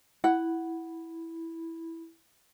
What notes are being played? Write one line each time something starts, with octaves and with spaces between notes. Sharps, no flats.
E4 F#5